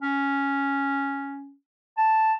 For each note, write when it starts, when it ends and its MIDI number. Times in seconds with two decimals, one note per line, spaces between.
0.02 1.54 61
1.98 2.34 81